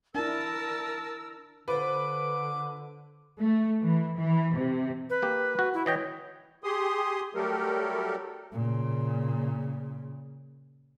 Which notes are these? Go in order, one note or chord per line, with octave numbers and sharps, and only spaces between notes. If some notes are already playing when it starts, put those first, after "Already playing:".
D4 E4 A#4 A5 E6
D3 F4 B4 C5 D6
A3
E3
E3
C3
B4
A#3 G4
F#4
E4
E3 C#5 D#5 G5
G4 G#4 C6 D#6
F#3 G3 A3 G4 A4 A#4
A#2 C#3